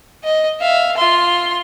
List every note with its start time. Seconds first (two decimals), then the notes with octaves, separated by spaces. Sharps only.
0.24 D#5
0.60 E5 F5
0.97 F4 C6